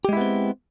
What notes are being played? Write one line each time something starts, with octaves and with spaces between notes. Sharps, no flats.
G#3 B3 C4 E4 G4